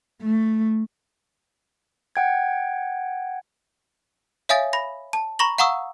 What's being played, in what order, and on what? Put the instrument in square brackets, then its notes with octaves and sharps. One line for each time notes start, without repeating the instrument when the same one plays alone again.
[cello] A3
[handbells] F#5 G5 G#6
[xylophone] C#5 E5 F5 G#5 D#6 A6
B5 A#6
A5
A#5 B5 C#6 A#6 F#7
F5 F#5 A#5 C#6 D#6 E6